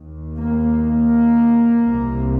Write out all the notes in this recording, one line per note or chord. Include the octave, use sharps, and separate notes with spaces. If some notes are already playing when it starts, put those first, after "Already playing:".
Already playing: D#2
A#3
A#3
C2 C3